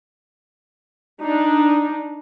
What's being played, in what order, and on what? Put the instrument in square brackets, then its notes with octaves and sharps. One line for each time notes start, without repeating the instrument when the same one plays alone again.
[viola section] D4 D#4